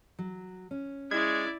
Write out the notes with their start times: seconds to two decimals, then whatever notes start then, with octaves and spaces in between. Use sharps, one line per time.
0.19 F#3
0.71 C#4
1.11 G#3 E4 D5 G#6